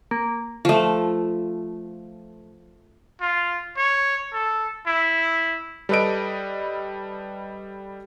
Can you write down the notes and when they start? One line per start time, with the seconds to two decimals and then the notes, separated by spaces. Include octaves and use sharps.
0.11 A#3
0.65 F3 A3
3.21 F4
3.77 C#5
4.33 A4
4.87 E4
5.89 G3 A4 B4 D#5 D7